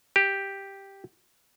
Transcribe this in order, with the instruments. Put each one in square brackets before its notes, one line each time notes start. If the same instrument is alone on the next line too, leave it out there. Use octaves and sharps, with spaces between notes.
[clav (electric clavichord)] G4